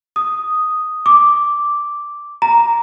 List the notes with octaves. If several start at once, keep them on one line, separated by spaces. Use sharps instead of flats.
D#6
D6
A#5